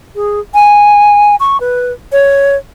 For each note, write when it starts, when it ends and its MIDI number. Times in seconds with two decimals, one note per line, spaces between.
0.15 0.40 68
0.54 1.36 80
1.40 1.60 85
1.60 1.92 71
2.12 2.56 73